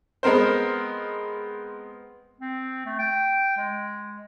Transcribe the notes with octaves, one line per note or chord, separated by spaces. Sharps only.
G#3 B3 C4 A#4 C5
C4
A3
G5
G#3